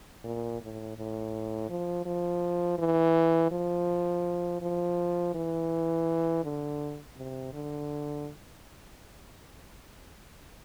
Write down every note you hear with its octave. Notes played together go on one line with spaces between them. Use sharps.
A#2
A2
A2
F3
F3
E3
F3
F3
E3
D3
C3
D3